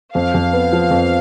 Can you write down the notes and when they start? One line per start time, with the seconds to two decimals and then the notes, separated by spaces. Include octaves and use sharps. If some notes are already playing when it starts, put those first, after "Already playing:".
0.15 F2 F5
0.34 F2
0.53 B3
0.73 F3
0.91 F2